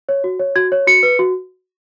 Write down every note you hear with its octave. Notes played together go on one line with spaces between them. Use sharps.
C#5
F#4
C#5
F#4 G#6
C#5
F#4 C#7
B4
F#4